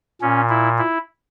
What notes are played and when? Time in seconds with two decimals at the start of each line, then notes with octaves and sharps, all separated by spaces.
0.21 A#2 C#4
0.49 E4
0.78 E4